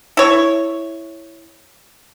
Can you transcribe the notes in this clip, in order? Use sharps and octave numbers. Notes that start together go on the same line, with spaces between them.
E4 C#5